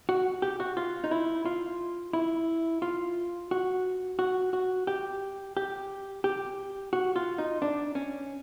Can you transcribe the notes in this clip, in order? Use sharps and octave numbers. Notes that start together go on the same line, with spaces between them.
F#4
G4
F#4
F4
D#4
E4
F4
E4
F4
F#4
F#4
F#4
G4
G4
G4
F#4
F4
D#4
D4
C#4